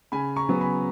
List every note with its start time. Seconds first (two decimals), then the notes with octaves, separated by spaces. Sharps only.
0.12 C#3 G#5 B5
0.36 A#5 C#6
0.49 F#3 B3
0.61 G#5 B5